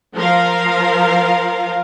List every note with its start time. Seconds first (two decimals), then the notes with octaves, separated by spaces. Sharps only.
0.16 F3 A#4 F5